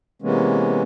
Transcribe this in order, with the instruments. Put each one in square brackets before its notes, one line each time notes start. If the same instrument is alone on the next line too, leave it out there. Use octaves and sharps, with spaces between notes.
[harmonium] C3 E3 G#3 A#3 B3 C#4